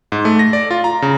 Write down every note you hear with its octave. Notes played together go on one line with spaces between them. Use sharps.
G#2
A3
A#6
D5
F4
A#5
C#3